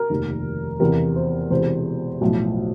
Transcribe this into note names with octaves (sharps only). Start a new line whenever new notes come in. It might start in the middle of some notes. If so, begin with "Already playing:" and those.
Already playing: A#4
F1 D#2 D#3
E2 C3 E3 A#4
C5
E1 E2 C3 C5
B1 A2 F3